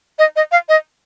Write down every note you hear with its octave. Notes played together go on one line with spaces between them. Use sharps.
D#5
D#5
F5
D#5